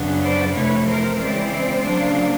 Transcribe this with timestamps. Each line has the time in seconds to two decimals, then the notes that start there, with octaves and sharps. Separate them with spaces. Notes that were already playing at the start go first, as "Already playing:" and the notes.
Already playing: F#2 C#3 F#3 B3 D4
0.21 C5 D5
0.54 F2 C3 E3 A3 B4 C#5
0.87 A#4 C5
1.19 C#3 E3 G#3 C4 C5 D5
1.86 C#3 F#3 A#3 D4